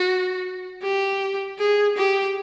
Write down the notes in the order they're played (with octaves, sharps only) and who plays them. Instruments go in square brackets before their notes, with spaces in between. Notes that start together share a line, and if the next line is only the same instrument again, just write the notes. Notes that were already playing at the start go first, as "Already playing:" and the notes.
Already playing: [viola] F#4
G4
G#4
G4